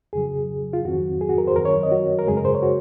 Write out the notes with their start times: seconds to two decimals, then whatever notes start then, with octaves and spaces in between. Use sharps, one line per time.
0.13 F2 C#3 F#3 G#4
0.73 F4
0.85 F2 D#3 F#3 C4 F#4
1.21 G#4
1.29 F#4
1.38 A#4
1.47 C5
1.56 F#2 D#3 F#3 C4 A#4
1.65 C#5
1.83 D#5
1.92 F#4
2.19 A#4
2.27 F#2 C#3 G#3 G#4
2.37 A#4
2.45 C5
2.55 C#5
2.63 F#4